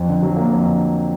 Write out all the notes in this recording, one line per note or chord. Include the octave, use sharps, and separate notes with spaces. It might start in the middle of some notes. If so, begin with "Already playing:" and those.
Already playing: F2
D3
F#3
A#3
F2
D3